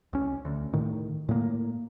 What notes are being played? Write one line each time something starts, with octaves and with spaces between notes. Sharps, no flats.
C2 C#4
D2
A2 D#3
A2 A#3